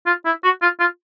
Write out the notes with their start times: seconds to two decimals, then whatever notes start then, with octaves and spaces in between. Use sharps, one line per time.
0.06 F4
0.25 E4
0.43 F#4
0.62 F4
0.80 F4